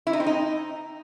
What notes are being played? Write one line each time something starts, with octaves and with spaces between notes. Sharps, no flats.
E4
D#4
C4
D#4